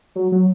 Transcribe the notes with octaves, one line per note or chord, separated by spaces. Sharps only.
F#3
F#3